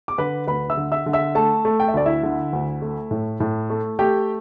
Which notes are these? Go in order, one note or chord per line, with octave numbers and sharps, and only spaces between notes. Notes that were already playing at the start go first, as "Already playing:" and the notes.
D6
D3 B4 B5
D2 B4 B5
E5 E6
D3
E5 E6
D3
E5 E6
A3 A4 A5
A3
G5
E5
D2 D5
E4 E5
D3
D2
A3
A2
A2
A3
A3 G4 G5